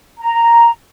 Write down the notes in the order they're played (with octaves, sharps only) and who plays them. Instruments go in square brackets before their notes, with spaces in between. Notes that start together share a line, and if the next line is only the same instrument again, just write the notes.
[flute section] A#5